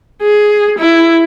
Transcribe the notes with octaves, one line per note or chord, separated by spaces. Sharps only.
G#4
E4